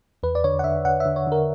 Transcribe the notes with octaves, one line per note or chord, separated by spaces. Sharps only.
E2 B4
D5
D3 C#5
F#5
D3 E5
D3 F#5
D3 E5
C#5
D3 A#4